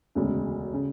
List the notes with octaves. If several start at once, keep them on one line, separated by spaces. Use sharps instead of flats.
E1 D2 C#3
C#3